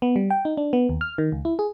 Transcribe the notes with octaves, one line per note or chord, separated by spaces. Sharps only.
B3
G3
G5
D#4
D4
B3
D#2
F6
D#3
C#2
E4
G#4